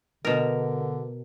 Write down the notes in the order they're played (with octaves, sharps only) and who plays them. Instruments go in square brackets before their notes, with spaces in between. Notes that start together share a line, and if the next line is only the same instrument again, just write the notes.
[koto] B2 A#4 [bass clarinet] D3